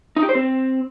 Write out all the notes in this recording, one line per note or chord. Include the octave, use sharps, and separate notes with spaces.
D#4
G4
C5
C4